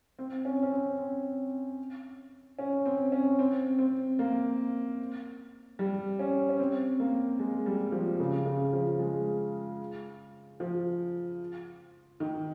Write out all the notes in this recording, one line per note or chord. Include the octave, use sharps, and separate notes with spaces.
C4
C#4
C#4
C4
C4
C#4
C4
C#4
C4
C4
A#3
G3
C#4
C#4
C4
A#3
G#3
G3
F3
C#3
C#3
F3
G#3
F3
D#3